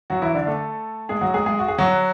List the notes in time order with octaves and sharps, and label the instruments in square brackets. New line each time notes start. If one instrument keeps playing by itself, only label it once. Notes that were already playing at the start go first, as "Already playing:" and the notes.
[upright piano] F#3 F#4
E3 E4
D3 D4
A3 A4
G#3 G#4
F#3 F#4
G#3 G#4
G#3 G#4
F#4
G#4
F#3 F#4